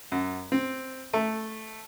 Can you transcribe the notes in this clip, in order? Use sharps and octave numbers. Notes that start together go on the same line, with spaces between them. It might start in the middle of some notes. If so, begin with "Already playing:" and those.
F#2
C4
A3